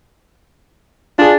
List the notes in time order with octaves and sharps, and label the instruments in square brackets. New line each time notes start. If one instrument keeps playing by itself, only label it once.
[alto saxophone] D4 [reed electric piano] F4 G#4